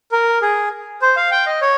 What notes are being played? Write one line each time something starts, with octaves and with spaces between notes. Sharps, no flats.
A#4
G#4
C5
F5
G5
D#5
C#5